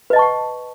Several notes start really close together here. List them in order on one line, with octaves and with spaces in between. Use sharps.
B4 D#5 A5 C#6 F#5